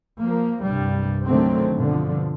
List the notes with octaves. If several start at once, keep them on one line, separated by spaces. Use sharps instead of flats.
F3 A#3
C2 G2 G3
D3 D#3 F#3 A3 C4
G2 B2 D3 F3